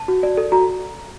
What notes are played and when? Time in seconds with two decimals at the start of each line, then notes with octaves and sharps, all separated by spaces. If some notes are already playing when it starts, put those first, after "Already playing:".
Already playing: A5
0.08 F#4
0.23 D5
0.37 A4
0.52 F#4 A#5